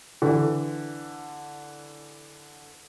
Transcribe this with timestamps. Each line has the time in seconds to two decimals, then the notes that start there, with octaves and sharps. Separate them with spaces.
0.22 D3 E3